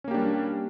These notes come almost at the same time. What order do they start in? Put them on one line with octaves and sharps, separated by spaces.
C#4 A#3 G4 D4 G3